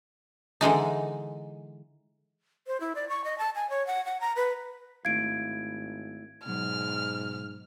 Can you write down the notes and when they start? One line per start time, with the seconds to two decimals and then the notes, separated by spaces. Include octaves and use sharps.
0.61 D3 E3 G#3 D#4
2.67 C5
2.80 E4
2.95 D5
3.09 C#6
3.24 D#5
3.38 A5
3.55 G#5
3.70 C#5
3.87 F#5
4.05 F#5
4.21 A#5
4.36 B4
5.05 G#1 A3 E4 F5 G#6 D7
6.46 G#2 B2 F#3 F6